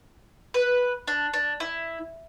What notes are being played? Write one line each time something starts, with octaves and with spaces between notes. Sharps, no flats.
B4
D4
D4
E4